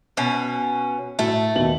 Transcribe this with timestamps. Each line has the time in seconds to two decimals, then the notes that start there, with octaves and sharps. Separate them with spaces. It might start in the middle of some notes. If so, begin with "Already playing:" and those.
0.17 B2 C#4
1.19 A2 A3 F#4
1.55 D#2 B2 F#7